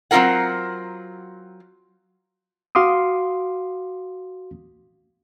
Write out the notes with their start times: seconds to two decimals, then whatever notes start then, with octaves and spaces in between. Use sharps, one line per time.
0.11 F#3 C4 D4 F4 A#4 F#5
2.75 F#4 F5 C6 D6 D#6